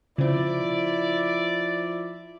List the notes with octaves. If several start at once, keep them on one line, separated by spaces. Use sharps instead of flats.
C#3 F3 C4 E4 D5